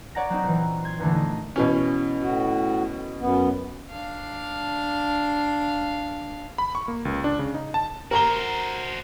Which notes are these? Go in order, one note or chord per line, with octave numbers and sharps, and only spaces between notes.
C#5 D5 F#5 A#5 A#6
F#3 C4 D#4
A#2 E3
C6 G#6
E2 A#2 D3 E3 A3
D#4
B2 E3 C#4
A2 F#4
F#2 B3
D4 F5
B5
C#6
A#3
C#2
D4
C#3
D#4
A5
F#4 A#4 C5 A#5 G7